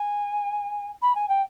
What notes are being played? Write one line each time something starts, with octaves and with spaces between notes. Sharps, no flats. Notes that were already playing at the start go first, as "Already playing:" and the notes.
Already playing: G#5
B5
G#5
G5